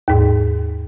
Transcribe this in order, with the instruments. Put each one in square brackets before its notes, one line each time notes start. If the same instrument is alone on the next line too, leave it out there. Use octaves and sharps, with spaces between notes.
[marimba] D#2 G#2